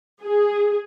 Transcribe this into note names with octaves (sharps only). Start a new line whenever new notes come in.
G#4